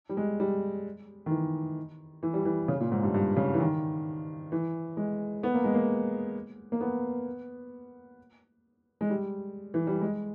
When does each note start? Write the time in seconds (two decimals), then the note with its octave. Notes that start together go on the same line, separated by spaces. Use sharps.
0.09 G3
0.17 G#3
0.40 G3
1.26 D#3
1.31 E3
2.23 E3
2.34 G3
2.45 E3
2.68 C#3
2.80 A#2
2.92 G#2
3.03 G2
3.14 G2
3.37 C#3
3.54 E3
3.60 D#3
4.52 E3
4.97 G#3
5.43 B3
5.54 A#3
5.64 G#3
5.74 A#3
6.72 A#3
6.81 B3
9.01 G#3
9.10 G3
9.74 E3
9.87 G3
10.01 G#3